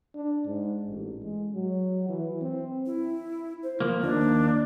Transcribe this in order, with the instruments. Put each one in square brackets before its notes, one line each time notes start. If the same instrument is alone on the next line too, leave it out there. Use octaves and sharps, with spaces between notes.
[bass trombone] D4
G#2
A1
G#3
F#3
E3
C4
[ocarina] E4
C5
[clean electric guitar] F3 A#3
[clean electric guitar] D#2 [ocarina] A#3 [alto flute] D4